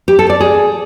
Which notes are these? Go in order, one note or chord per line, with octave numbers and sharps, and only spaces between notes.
G4
A4
D5
G#4